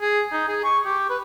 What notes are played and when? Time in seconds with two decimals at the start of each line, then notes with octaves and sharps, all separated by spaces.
0.01 G#4
0.32 D#4
0.48 G#4
0.64 C#6
0.85 G4
1.10 B4